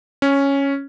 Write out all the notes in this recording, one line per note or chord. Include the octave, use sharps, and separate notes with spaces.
C#4